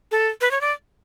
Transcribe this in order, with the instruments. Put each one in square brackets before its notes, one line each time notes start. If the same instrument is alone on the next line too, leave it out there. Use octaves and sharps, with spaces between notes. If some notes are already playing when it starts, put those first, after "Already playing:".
[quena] A4
B4
C#5
D5